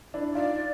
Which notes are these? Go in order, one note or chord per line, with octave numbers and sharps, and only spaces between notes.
D4 E4
D#4 F4 D5